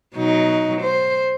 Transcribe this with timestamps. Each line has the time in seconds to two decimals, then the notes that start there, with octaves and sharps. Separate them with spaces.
0.15 B2 F#3 D#4
0.82 C5